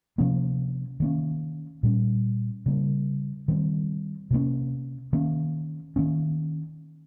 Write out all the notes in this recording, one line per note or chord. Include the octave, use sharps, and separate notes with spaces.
C3 F3 A#3 C#4
D#3 A#3 C#4
A#2 G3 C#4
C#3 G3 A#3
D#3 G3 C4
C3 G3 A#3 C#4
D#3 A#3 C#4
D#3 A#3 C#4